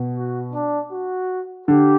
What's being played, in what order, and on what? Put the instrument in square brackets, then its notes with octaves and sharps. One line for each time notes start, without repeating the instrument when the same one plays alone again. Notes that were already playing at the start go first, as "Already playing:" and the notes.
Already playing: [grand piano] B2
[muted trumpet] F#4
D4
F#4
[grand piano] D3 [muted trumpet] G4